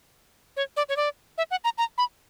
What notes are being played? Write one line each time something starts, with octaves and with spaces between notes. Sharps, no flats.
C#5
D5
C#5
D5
E5
F#5
A#5
A#5
B5